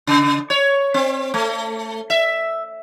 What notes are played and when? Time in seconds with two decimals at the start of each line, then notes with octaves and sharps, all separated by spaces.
0.07 C#3
0.50 C#5
0.94 C4
1.34 A3
2.10 E5